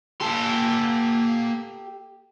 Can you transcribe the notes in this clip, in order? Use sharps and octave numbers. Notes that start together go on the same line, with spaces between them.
A#3 G4 A4 C6